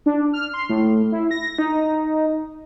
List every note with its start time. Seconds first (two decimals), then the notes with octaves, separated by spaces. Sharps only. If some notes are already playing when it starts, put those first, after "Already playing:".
0.06 D4
0.33 F6
0.53 C6
0.69 A2
1.12 E4
1.31 A#6
1.58 D#4